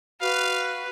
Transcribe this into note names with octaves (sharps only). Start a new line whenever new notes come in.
F#4 B4 F5